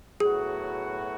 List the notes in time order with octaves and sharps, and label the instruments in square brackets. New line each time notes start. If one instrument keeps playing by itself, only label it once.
[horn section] A2 F#3 B3 F#4 [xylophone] G#4